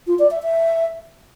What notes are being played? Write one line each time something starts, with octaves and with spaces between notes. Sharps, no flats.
F4
D5
E5
E5